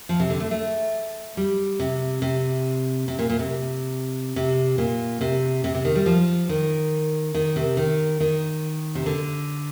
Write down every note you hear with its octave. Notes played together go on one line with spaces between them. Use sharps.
F3
C3
D3
A3
A3
G3
C3
C3
C3
A#2
A#2
C3
C3
A#2
C3
C3
C3
D#3
G3
F3
D#3
D#3
C3
D#3
D#3
C3
D3